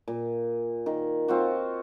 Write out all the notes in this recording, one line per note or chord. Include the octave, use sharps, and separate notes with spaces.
A#2
D#3
C4 F4 F#4